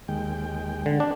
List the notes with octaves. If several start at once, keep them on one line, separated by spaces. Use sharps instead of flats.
D#2 G#3 G5
D3
D4